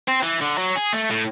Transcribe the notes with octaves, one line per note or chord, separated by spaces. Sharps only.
C4
E3
D3
F#3
G#4
A3
A2